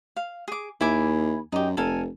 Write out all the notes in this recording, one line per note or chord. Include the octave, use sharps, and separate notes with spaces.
F5
G#4 D6
D#2 E4 G#5 D6
F#2 D#4 G4
F1 A4 A#4 G#5